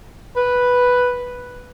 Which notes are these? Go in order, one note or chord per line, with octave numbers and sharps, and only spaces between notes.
B4